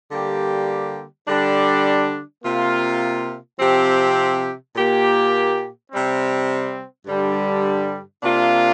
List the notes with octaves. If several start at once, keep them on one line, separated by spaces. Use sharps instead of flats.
D3 G3 A#3 G4
D3 G3 D4
C3 A#3 F4
C3 F3 C4 G4
A#2 A#3 G4
C3 G3 C4
G2 D3 G3
C3 A#3 D4 F4